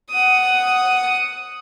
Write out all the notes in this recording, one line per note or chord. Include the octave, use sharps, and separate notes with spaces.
F#5 D#6